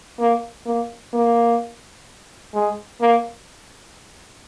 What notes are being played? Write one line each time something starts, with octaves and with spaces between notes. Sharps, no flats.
A#3
A#3
A#3
G#3
A#3